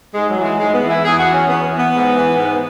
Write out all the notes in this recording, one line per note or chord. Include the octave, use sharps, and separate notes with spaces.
G#2 G#3
F#3
E3
G#3
G#2 G#3
B3
E3
E4
E2 G#4
F#4
E3
C#4
E2 B3
E3
B3
G#2
E3
G#2